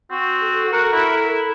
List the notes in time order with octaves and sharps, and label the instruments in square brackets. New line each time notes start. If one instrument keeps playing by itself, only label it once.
[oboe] C4 [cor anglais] F#4
[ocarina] A4
[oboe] F#4 [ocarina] A4 [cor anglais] A#4
[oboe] E4